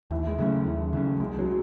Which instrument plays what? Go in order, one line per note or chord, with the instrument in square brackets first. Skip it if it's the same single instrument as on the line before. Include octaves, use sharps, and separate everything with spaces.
[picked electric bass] D#2 [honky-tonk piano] E3
[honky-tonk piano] G#3
[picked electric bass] C#3 F#3 C#4 [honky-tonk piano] A3
[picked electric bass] D#2
C#3 F#3 C#4
[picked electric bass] C2 [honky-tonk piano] G#3
[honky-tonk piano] F#3